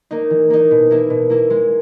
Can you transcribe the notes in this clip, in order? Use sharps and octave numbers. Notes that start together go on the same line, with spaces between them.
A#3 D#4
E3
A#3 D#4
B2
A#3 E4
B2
A#3 E4
G#3